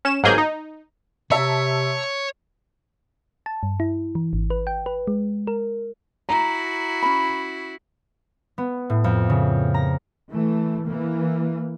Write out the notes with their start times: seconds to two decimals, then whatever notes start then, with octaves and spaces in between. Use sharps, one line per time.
0.05 C#4 E7
0.23 G1 G#2 F#3 A#3 G#4 G6
0.38 D#4
1.31 C3 C#5 E5 A5 A#5
3.46 A5
3.63 G2
3.80 E4
4.15 E3
4.33 G#1
4.50 B4
4.67 G5
4.86 B4
5.07 G#3
5.47 A#4
6.29 E4 F#4 A#5
7.03 C#4 B5
8.58 B3
8.90 A2
9.04 F2
9.30 C#3
9.74 A#5
10.29 E3 A3
10.84 E3 A#3